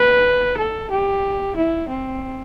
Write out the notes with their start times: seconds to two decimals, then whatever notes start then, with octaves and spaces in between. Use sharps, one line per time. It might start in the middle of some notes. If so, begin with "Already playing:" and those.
Already playing: B4
0.57 A4
0.90 G4
1.56 E4
1.89 C4